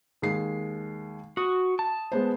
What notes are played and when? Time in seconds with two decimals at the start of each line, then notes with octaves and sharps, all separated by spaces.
0.22 D#2 G#3 C7
1.37 F#4 D#6
1.79 A5
2.12 G#3 B3 C5